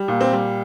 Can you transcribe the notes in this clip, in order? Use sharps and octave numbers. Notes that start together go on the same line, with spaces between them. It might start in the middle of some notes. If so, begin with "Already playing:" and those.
Already playing: G3
A#2
C4
G3